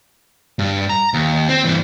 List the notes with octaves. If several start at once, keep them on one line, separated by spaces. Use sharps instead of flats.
G2
A#5
D#2
C4
G2 E3